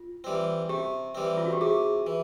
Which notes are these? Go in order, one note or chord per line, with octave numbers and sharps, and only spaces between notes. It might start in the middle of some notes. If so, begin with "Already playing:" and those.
Already playing: F4
E3 G3 C4
C3 G4
E3 G3 C4
F4
F#4
G4
C3 G#4
E3